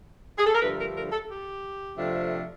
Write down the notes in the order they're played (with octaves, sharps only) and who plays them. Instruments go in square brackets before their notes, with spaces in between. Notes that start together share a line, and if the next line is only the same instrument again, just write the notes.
[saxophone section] G#4
A4
A#4
G2 D3 F3 A3 B4
A#4
A#4
A4
G4
F2 C3 F3 A3 D4